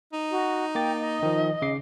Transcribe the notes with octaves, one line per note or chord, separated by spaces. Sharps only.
D#4
F#4
A#3 G5 D6 A6
D#5
D#3 F3
C#3 D6 C7